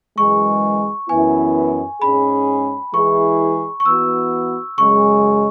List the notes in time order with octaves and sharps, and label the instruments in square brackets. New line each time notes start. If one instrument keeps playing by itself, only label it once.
[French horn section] F#2 E3 G#3 [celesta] C#6
[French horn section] F#2 E3 B3 E4 [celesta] G#5
[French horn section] G#2 G#3 C#4 G#4 [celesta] B5
[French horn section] E3 G#3 E4 G#4 [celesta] C#6
[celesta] C#6
[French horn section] E3 B3 F#4 [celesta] E6
[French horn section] F#2 C#3 G#3 [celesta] C#6